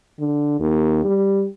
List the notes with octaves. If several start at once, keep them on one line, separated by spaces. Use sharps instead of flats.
D3
D#2
G3